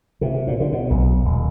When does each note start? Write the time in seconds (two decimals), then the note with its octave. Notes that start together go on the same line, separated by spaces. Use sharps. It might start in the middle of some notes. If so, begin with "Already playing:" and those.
0.21 C3
0.47 A#2
0.60 D3
0.72 B2
0.90 B1
1.25 D#1